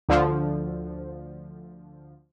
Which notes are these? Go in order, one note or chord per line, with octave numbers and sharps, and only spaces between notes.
D2 D3 F3